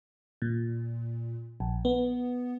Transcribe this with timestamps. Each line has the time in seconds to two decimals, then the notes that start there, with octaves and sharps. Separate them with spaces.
0.42 A#2
1.60 A#1
1.85 B3